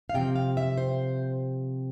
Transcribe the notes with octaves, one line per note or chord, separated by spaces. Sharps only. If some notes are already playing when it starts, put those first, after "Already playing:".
F5
C3 F3 C4 G5
F5
E5
C5